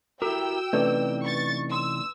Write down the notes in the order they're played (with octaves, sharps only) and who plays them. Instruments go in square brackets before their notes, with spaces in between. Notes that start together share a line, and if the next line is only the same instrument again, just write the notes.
[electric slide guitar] E4 G4 A#4 [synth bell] F#4 [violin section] G5 E6
[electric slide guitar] C3 E3 D#4 [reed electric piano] A3 C#4 D5 [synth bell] B4
[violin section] C#6 A6
[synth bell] C6 [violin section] E6